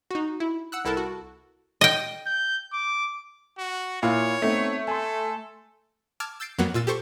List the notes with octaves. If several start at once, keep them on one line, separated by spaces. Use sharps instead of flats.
D#4 F#4
E4
F#5 E6 F#6
C2 E4 A4 A#4 A5
F#4
D#5 G5
G6
D6
F#4
A#2 E4 F4 C#5
A3 B3 C4 D#4
A4 G#5 C6
A5 D6 E6 F6 G#6
E6 G6 A6 C7 D7
F2 F#3 A#3 B3
A#2 F4 E6 A6
G4 A4 C5 C#6